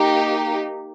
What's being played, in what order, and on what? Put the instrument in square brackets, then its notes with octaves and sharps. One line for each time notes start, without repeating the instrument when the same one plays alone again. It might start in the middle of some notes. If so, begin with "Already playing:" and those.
Already playing: [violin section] A#3 D#4 G4